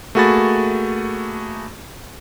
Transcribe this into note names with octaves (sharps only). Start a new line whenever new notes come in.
A3 A#3 F#4 G#4 B5 A6